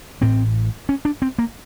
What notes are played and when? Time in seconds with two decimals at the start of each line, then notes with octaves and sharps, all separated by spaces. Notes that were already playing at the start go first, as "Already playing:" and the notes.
0.21 A1 A2 C4
0.89 C#4
1.05 D4
1.22 C4
1.38 A#3